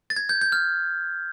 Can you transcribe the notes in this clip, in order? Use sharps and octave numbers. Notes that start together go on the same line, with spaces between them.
A6
G#6
G6
G6
F6